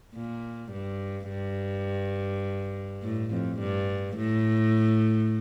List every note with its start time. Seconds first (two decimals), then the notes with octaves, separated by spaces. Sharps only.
0.15 A#2
0.72 G2
1.29 G2
3.02 A2
3.31 F2
3.59 G2
4.16 A2